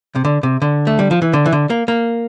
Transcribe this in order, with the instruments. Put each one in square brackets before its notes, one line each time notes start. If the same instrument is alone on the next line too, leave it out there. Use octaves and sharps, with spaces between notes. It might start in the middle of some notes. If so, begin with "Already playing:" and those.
[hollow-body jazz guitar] C3
D3
C3
D3
A3
G3
F3
E3
D3
E3
D3
A#3
A#3